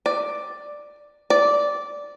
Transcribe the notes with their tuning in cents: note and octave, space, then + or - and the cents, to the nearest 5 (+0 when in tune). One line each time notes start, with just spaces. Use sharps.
D5 +5
D5 -10